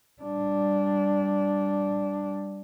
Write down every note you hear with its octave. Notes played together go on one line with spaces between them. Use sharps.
G3 D4